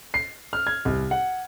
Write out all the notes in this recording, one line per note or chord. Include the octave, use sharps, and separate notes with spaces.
C7
F6
G#6
C2
F#5